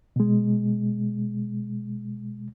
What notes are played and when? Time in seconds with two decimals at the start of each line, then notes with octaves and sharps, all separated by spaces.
0.16 B2 G#3